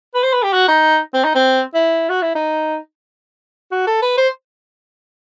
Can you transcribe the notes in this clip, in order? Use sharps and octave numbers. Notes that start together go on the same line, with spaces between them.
B4
C5
B4
G4
F#4
D#4
C4
D#4
C4
E4
F#4
E4
D#4
F#4
A4
B4
C5